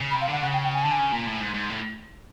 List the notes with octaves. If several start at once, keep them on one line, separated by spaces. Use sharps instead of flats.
C#3
B5
C3
F5
D3 F#5
C#3 F#5
G5
G5
G#5
D3 A5
G#5
C#3
A#2
A2
G#2
G#2
A2